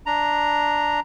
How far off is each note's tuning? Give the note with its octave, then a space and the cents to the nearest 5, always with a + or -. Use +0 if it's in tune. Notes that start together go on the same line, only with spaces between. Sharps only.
D4 +0 A#5 +0